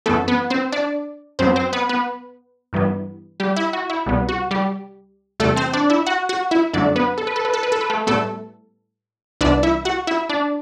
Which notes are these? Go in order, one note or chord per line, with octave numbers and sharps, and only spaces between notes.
F#2 E3 A3 B3 A4
B3 B4
C4 C5
D4 D5
F#2 F#3 B3 C4 C5
C4 C5
B3 B4
B3 B4
G2 E3 G3 B3
G3 G4
E4
F#4
E4
C2 B2 G3 B3
F#4
G3 G4
E2 C3 G3 A3 A4
C4 C5
D4 D5
E4 E5
F#4 F#5
F#4 F#5
E4 E5
F#2 D3 F#3 A3 D4 D5
B3 B4
A4
B4
A4
B4
A4
B4
A4
B4
A3 A4
A2 G3 A3 B3 A4
C2 C3 E3 B3 D4 D5
E4 E5
F#4 F#5
E4 E5
D4 D5